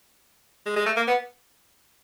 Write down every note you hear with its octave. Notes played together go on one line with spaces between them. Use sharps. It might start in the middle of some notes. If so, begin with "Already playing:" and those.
G#3
G#3
A3
A#3
B3